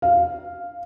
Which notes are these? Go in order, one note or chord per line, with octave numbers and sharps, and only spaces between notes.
F5